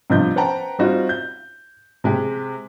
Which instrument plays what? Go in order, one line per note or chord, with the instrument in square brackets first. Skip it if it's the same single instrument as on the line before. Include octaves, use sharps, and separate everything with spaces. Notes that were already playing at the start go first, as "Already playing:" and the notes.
[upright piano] G2 C3 F3 B3 D#5 G6
B4 C5 F#5 G5 A5 A#5
G3 C4 D#4 F4 F#4
G6
C3 G#3 G4